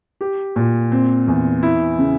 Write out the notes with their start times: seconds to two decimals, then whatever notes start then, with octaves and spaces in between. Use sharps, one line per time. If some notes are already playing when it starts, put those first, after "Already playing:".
0.21 G4
0.56 A#2
0.92 C4
1.28 E2
1.63 E4
1.99 C#3